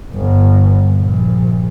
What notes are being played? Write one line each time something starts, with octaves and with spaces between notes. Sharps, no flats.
G1
A#1